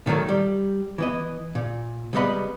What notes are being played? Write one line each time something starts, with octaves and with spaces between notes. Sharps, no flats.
A#2 D#3 F#3 A3 A#3
G3
E3 B3 D#5
A#2
C#2 C3 G3 B3 D#5 B5